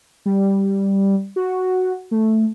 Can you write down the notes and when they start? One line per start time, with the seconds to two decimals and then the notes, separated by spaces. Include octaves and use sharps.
0.26 G3
1.36 F#4
2.11 A3